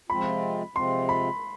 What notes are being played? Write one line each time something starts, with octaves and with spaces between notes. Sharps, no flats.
C3 F3 G#3 C4 F4 B5
C3 F3 G#3 C4 F4 C6
B5